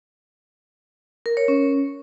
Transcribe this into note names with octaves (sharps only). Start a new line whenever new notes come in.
A#4
C#5
C#4